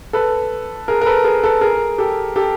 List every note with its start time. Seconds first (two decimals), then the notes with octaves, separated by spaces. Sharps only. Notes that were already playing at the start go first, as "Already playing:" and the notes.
0.13 A4 B4
0.88 G#4 A#4
1.01 A#4
1.06 A4 B4
1.24 G#4 A#4
1.44 A4 B4
1.61 G#4 A#4
1.98 G4 A4
2.36 G4 A4